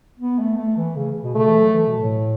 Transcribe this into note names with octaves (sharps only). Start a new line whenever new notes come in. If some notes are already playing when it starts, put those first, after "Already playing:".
B3
A3
A3
E3
C#3
B2
C#3 A3
E3
F#3
E3
B2
A2